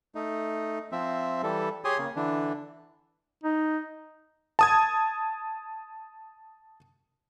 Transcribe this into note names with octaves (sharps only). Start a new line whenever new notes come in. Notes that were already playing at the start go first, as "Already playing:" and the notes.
A3 D#4
F3 C4 E5
E3 G3 A4
G4 G#4 C#5 G#5 C6 D#6
C#3 A#3
D3 E3 D4
D#4
A5 D#6 G#6